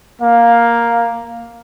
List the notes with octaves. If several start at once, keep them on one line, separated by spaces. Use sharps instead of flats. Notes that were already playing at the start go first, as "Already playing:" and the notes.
A#3 F5